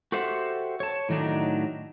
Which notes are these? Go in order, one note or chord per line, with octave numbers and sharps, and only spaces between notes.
F#4 G4 A4 C5 E5 F#5
C#5 A5
A2 D#3 F#3 A3 D4 D#4